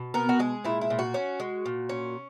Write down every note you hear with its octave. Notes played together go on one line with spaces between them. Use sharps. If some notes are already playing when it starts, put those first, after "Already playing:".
Already playing: B2
B3 A#4
F#4
G#3 G#4
A#2 E4
E4
A#2
F#4
C#4
G#3
A#2
C#4